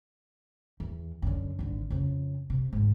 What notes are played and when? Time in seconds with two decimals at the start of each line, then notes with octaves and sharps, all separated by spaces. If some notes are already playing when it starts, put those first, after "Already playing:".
0.80 E2
1.22 F#2 D3
1.59 G#1 D3
1.90 F2 C#3
2.50 C3
2.73 G#2 D#3